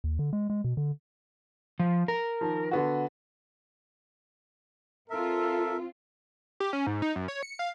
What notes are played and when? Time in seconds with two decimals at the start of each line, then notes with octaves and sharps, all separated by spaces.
0.04 D#2
0.19 D3
0.33 G#3
0.50 G#3
0.64 B2
0.77 D3
1.80 F3
2.08 A#4
2.41 D#3 F3
2.71 D3 B3 F#4
5.10 C4 F4 A4 A#4 E5
6.60 G4
6.73 C#4
6.87 G#2
7.02 D#4
7.16 F#2
7.28 C#5
7.43 C#7
7.59 F5